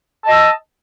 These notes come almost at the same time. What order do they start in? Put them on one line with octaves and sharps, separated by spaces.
A5 D#5 E6